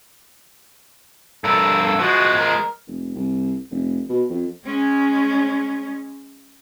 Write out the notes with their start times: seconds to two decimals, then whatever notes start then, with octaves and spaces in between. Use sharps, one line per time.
1.44 G2 A4 A#4
1.81 A4
1.99 F3 G#3 F#4
2.39 A#4
2.87 F1
3.15 C2
3.70 F1
4.09 B2
4.30 F2
4.65 G#3 C#4